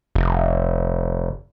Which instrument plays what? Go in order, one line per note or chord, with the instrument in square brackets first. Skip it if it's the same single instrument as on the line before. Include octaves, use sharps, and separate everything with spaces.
[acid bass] F1